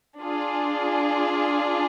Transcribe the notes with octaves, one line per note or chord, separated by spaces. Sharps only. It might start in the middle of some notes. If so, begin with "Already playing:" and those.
D4 F4 G#4